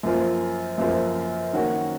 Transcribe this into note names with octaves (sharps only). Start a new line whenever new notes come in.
F#2 F3 A#3 F4 C5
F#2 F3 A#3 F4 C5
D#3 A#3 C#4 F#4